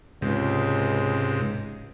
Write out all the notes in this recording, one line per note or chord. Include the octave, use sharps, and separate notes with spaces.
C#2 G#2 C3